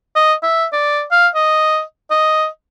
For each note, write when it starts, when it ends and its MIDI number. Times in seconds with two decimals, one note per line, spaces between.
0.16 0.34 75
0.43 0.66 76
0.72 1.04 74
1.12 1.28 77
1.35 1.82 75
2.11 2.47 75